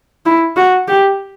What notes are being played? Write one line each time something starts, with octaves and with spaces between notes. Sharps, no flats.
E4
F#4
G4